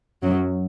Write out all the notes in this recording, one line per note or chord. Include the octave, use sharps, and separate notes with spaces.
F#2 F#3